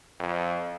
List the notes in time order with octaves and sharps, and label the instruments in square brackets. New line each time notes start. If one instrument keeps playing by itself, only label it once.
[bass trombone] F2